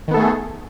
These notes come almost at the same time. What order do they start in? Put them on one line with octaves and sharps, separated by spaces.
D#3 B3 A4 A3 G#4